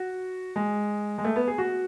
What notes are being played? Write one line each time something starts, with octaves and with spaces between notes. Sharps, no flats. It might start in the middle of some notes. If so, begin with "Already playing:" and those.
Already playing: F#4
G#3
G#3
A3
B3
G#4
F#4